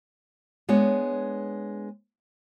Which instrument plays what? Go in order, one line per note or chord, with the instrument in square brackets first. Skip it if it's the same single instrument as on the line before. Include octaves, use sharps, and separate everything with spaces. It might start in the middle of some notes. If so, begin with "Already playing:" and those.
[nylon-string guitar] G#3 B3 D4 C#5